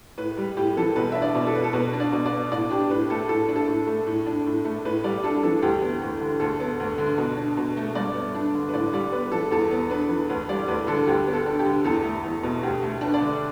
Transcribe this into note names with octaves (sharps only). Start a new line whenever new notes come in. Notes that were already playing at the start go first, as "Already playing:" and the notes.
A2 B4
G3
A2 G4
E3 A4
B2 B4
D4 E5
D5
B2
A4
B3 B4
A4
B2 B4
D4
D5
B2
D5
B3
A2 D5
D4 G4
A2 B4
A3 A4
A2 A4
D4
A4
A2
A3
A2
D4
A2
A3
A2 B4
G3 D5
D4 A4
E3 A4
D2 G4
B3
D2
D3
D2 A4
B3
D2
D3
B2
D4
B2
A3
G2 D5
B3
D4
D3
B4
A2 D5
G3 D5
B3 B4
E3 A4
E2 A4
B3
D4 B4
E3
D2 B4
G3 D5
D2 B4
D3 A4
D2 G4
B3
A4
D4
G4
D3
E2 A4
A3
E2
B2
D2 G4
A3
D4 B4
D5
D3